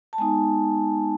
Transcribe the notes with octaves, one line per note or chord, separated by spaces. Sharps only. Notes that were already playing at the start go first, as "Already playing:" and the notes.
A5
G#3 B3 D#4 G#5